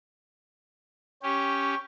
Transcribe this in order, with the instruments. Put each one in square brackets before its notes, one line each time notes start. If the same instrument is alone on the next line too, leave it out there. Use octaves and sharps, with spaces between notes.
[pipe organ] C#4 G4 [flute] C#6